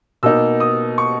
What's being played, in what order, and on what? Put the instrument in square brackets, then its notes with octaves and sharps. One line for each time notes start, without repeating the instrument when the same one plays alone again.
[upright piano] B2 A#3 D#4 E6
D#6
C#6